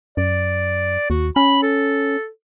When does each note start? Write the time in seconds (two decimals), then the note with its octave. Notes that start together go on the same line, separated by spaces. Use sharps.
0.17 F#2 D5
1.10 D#2 F#4
1.36 C#4 B5
1.63 A4